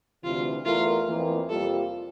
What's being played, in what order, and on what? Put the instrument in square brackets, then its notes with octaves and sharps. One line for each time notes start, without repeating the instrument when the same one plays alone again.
[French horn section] D2 C3 E3 [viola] F4
[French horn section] E2 E3 A3 E4 A#4 [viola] F4
[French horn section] F2 E3 A#3
[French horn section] F2 C3 G3 A#3 F4 [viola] A4